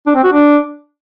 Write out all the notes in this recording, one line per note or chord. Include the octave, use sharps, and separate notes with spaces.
D4
C4
F#4
D4